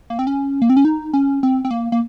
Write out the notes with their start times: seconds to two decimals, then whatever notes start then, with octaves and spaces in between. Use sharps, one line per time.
0.10 A#3
0.19 C4
0.27 C#4
0.62 A#3
0.70 C4
0.77 C#4
0.85 D#4
1.13 C#4
1.43 C4
1.65 C4
1.71 A#3
1.92 A#3